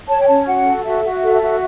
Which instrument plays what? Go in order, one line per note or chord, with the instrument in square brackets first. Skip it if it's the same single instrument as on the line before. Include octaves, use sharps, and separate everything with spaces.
[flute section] C#5 A5
G5
C#4 A5
F#4 F#5
A4
F#4 E5
F#4
A4
F#4